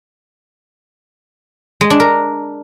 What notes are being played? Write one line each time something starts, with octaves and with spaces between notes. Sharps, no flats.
G#3
D4
A#4